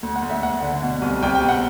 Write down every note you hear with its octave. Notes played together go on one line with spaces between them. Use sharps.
D2
F#5
D2
E5
D2 F#5
D3
B2
C2
C2 G5
G5
B2
F#5